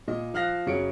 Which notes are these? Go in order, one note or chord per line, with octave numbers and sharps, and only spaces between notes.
A#2 D#5
F3 F5 F6 F#6 A#6
F#2 C#3 F#3 C#5 C#7 D7